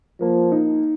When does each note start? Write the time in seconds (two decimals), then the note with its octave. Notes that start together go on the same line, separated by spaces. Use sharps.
0.21 F3 A#3
0.52 D#4